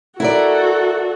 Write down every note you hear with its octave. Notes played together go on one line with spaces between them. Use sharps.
E4 F#4 A4 A#4 D5